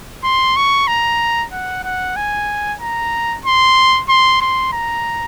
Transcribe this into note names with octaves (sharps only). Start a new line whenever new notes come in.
C6
C#6
A#5
F#5
F#5
G#5
A#5
C6
C6
C6
A#5